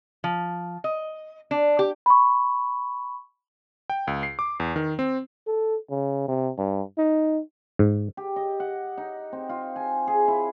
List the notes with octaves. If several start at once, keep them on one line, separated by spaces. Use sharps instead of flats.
F3
D#5
D4
G4
B5 C#6
G5
C#2
C7
D6
E2
D#3
C4
A4
C#3
C3
G2
D#4
G#2
G4
D#5
F#5
D#4
C4
F4
G#5
G#4
E4